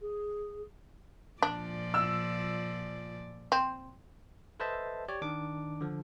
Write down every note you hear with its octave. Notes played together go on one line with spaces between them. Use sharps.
G#4
A#2 F3 D4 D5
E6
C4
A4 B4 C5 D#5 E5 A5
G4 C#5 D5
D#3 D4 D6
D3 F3